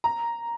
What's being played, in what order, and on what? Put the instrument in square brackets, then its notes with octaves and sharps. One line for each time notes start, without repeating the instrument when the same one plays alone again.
[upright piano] A#5